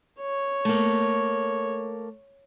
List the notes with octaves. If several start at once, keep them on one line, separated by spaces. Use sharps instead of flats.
C#5
A3 A#3